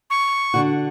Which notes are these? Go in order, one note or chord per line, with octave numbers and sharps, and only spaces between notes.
C#6
D3 F#4